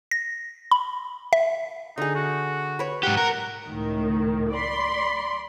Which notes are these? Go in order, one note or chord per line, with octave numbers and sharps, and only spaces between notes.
A#6
B5
E5
D3 D#4 G#4
F#4
B4 C#5
G#2 G4 F#5
A#4 F#5
C#2 A2 D#3
D5 B5 C6